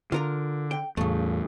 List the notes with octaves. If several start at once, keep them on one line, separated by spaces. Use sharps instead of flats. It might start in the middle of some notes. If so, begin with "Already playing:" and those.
D3 F4 A#4 A#5
G5
E2 A2 C#3 A3